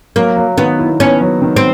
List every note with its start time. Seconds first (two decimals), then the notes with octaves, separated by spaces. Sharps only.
0.16 F#3 A#3
0.36 F#3
0.57 D#3 B3
0.79 E4
1.00 B3 C#4
1.21 F#3
1.42 D#3
1.56 C4